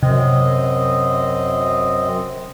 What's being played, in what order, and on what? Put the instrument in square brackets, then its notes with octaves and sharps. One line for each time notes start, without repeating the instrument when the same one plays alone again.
[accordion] F#2 C4 D#5 [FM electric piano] C3